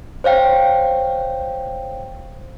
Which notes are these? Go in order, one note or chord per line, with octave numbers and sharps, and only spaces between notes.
C5 C#5 F5 G5